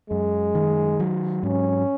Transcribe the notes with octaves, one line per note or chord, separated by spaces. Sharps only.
F#2 G#3
D#3
F#3
G#2 C#4